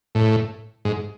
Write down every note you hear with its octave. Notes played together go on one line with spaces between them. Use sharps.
A2
G#2